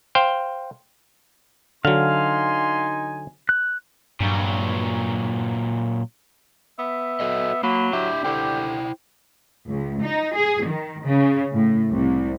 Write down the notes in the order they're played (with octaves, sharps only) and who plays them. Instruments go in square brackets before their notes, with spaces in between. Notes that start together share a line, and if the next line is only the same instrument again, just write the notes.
[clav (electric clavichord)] C5 F5 G5
[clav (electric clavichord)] D3 F#3 [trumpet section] D#4 G#5 C6 [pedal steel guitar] F5
[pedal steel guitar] F#6
[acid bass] G2 [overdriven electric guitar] A#2 F#3
[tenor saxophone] B3 [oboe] E5
[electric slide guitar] F#4 A4 D#5
[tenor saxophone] F#3 [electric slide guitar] A#3 [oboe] B5
[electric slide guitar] D4 E4 E5 [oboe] G4
[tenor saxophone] D3 [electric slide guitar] E4 C5 G5
[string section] C#2
D#4
G#4
D#3
C#3
A2
C2